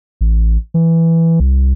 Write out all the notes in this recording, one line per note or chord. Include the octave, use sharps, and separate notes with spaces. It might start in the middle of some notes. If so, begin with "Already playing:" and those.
A1
E3
C2